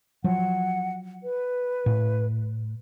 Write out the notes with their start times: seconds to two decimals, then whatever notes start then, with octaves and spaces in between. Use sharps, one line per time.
0.24 F3 F#3 F#5
1.23 B4
1.86 A2